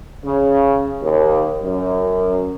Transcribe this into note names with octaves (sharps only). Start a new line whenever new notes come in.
C#3
D#2
F#2